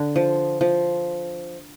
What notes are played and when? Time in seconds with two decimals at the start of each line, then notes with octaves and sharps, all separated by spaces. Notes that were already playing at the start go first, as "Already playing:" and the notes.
Already playing: D3
0.16 F3
0.61 F3